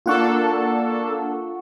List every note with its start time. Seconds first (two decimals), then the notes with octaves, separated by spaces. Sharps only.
0.06 A#3 D4 F4 A4 F#5 C#6